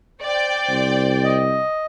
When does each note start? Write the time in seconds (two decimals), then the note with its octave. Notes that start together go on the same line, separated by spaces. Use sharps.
0.22 C5 D5 G5
0.70 C2
1.24 D#5